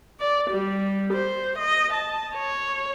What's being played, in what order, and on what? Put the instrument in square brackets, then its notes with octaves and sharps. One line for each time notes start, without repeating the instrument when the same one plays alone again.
[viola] D5
G3
C5
D#5
A5
C#5